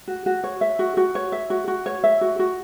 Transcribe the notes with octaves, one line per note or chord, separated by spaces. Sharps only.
F#4
F#4
C#5
E5
F#4
F#4
C#5
E5
F#4
F#4
C#5
E5
F#4
F#4